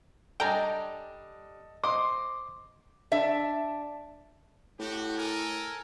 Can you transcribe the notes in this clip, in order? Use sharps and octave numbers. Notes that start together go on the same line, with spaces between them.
G3 D4 A4 D#5 G5 G#5 A#5
C5 D#5 C6 D6
D4 E5
A2 F#4 G4
A4 A#4 G#5